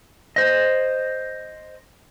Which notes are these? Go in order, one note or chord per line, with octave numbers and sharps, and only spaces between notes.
C5 D#5